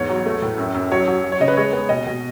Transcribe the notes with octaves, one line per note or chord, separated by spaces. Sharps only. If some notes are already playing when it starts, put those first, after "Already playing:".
Already playing: E2 G#2 C#5
F#3
A3
A2
F#2
F#2
F#3 C#5
F#3
F#3
C#5
C#3 D#5
B4
G#3 C#5
B3
B2 D#5
B2